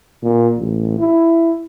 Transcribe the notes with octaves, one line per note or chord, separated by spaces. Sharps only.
A#2
A1
E4